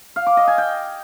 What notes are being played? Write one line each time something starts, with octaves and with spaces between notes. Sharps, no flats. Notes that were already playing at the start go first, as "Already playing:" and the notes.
F5
D6
D#5
G#5
G5